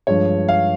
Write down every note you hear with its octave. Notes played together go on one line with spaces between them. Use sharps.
G2 F3 G#3 C#5
F5